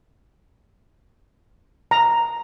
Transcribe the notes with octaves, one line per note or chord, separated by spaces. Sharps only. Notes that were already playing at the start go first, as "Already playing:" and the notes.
A#5